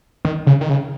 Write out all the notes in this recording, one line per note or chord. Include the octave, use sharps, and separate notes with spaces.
D#3
C#3
D#3
C#3